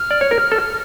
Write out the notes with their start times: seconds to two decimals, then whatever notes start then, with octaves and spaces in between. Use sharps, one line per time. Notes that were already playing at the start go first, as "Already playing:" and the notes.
Already playing: F6
0.11 D5
0.21 C#5
0.31 A#4
0.52 A4